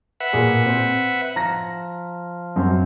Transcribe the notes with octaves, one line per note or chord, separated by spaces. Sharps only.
B4 E5 F#5
A#2 G#4
C4
F3 A#5 A#6
F#2 C4